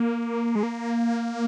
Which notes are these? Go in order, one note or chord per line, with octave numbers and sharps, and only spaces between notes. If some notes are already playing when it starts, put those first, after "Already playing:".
Already playing: A#3
G#3
A#3